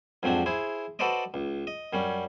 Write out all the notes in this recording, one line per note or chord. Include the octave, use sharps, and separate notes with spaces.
F2 G#2 F#3 C4 D4
E4 G#4 C5
F#4 A4 B4 C5 D5 D#5
C#2
D#5
F#2 G3 C#4